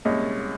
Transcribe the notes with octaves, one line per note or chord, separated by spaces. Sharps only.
C2 A#2 G#3 C#4 D#5